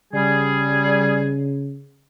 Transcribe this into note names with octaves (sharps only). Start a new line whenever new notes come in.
C#3 G3 G#4